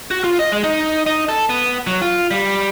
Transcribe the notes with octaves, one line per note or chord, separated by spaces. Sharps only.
F#4
F4
D#5
G#3
D#4
D#4
A4
B3
F#3
F4
G3